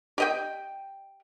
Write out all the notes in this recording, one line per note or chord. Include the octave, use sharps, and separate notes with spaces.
G4 D#5 G5